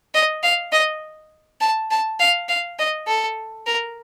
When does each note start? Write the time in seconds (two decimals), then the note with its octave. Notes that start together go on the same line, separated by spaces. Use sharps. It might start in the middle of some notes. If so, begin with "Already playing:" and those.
0.15 D#5
0.43 F5
0.72 D#5
1.61 A5
1.91 A5
2.20 F5
2.49 F5
2.79 D#5
3.08 A4
3.67 A#4